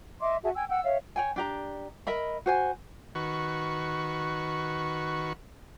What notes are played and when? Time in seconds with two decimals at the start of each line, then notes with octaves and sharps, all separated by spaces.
0.21 D#5 E5 C6 D6
0.43 F#4 G#4 E5 A5
0.54 G5 G#5 E6
0.70 F#5 G5 E6
0.83 C#5 E5 F5
1.16 C#5 G5 G#5
1.36 D4 G4 A#5
2.07 A#4 D#5 E5 B5
2.46 F#4 C5 G#5
3.15 D#3 F#4 B4 C#6